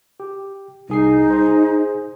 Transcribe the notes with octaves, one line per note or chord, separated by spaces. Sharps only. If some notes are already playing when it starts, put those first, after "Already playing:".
G4
C2 D#4 G#4 C7
G#4 C5